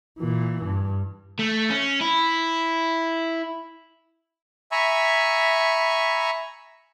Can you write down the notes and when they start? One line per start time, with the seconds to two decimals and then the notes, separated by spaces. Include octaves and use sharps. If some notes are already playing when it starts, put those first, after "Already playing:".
0.19 A#2 E3
0.63 G2
1.39 A3
1.70 C#4
2.01 E4
4.72 E5 G#5 A#5 B5 C#6